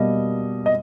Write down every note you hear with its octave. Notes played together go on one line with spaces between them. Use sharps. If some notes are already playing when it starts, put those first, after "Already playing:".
Already playing: B2 G3 A#3 D#5
D#5